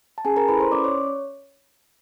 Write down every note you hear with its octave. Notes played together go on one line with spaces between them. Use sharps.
A5
C#4 G#4 G#5
A#4 A#5
E4 A4 B4 B5
C5 C6
C#4 D5 D6
C#5 C#6